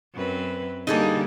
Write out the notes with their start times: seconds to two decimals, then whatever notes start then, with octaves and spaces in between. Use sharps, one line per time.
0.14 F#2 C4 B4
0.87 D3 G3 A#3 D#4 G#4 A4